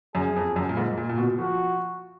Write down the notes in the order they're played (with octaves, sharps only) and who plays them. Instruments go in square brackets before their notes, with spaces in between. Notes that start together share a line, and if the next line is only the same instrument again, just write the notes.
[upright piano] F#2 [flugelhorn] G#4
[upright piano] F2
F#2
A#2
G#2
A#2
A#2
B2
[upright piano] F3 [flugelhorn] F#4